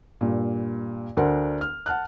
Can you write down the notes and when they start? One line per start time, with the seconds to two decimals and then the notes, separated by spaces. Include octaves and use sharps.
0.21 G2 A#2
1.17 D2 D4 A#4 C5 F#5
1.61 F6
1.86 F#5 A5 F6 F#6